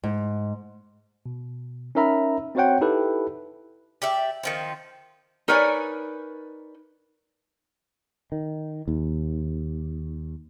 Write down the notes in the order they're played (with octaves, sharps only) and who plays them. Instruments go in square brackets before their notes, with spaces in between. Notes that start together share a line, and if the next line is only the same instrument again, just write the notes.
[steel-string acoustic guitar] G#2
[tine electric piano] B2
C#4 D#4 A#4 E5 A#5 B5
C4 F#4 C5 C#5 F#5 G5
D#4 E4 G4 A4 B4
[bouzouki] G4 D5 E5
D#3 F3 C4
[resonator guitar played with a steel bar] D#4 A#4 B4 C#5 D5 G#5
[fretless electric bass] D#3
D#2